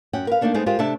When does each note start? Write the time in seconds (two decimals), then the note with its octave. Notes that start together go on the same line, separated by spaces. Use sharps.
0.13 F#2 C#4 F#5 G5
0.27 A#4 B4 F5
0.41 D#3 F3 A3 A#3 D4 D#4
0.54 G#3 A3 B3 C4 D#4 G#4
0.66 G#3 F4 G4 A#4 C5
0.79 C3 A3 D4 E5 A5